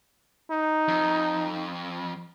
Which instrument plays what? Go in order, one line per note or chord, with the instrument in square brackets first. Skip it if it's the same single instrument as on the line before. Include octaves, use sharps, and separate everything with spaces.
[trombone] D#4
[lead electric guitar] F2